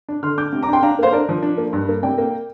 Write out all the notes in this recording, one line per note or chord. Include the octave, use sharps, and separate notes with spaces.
D4
D3 C6 F6
D4 D6 G6
C3
A#5 D6
D4 G5 C6
D4 F5 A#5
A#3 C5 F5
D4 A#4 D5
F3
D4
A#3
G2
A#3
C3 D5 G5
A#3